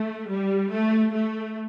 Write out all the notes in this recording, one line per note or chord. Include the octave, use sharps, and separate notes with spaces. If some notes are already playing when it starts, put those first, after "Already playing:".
Already playing: A3
G3
A3
A3